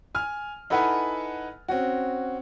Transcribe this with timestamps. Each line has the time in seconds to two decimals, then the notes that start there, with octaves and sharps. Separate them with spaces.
0.15 G#5 F6
0.70 D#4 E4 A4 B4 F#5 G#5
1.68 C4 C#4 F#4